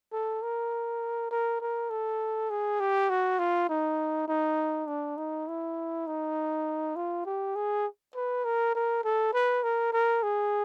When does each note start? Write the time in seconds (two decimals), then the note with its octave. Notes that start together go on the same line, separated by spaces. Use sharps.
0.12 A4
0.42 A#4
1.31 A#4
1.61 A#4
1.90 A4
2.50 G#4
2.80 G4
3.10 F#4
3.39 F4
3.69 D#4
4.28 D#4
4.88 D4
5.17 D#4
5.48 E4
6.07 D#4
6.96 F4
7.26 G4
7.55 G#4
8.15 B4
8.45 A#4
8.75 A#4
9.04 A4
9.34 B4
9.63 A#4
9.93 A#4
10.23 G#4